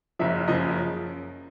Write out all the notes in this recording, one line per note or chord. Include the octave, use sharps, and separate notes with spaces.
F#1 F#2 C#3 F3 E5
F#1 F#2 C#3 F3 D#5